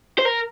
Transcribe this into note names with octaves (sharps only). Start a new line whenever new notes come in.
C5
A#4